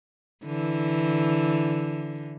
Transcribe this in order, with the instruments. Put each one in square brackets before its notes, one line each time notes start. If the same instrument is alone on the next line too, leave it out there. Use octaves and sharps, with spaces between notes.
[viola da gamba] D3 E3